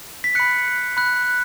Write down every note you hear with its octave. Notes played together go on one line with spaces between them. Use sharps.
B6
B5 F#6 C#7
B5 F#6